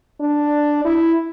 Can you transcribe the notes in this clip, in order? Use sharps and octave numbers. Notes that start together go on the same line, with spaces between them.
D4
E4